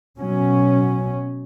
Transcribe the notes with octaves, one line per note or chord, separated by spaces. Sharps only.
B2 F#3 C#4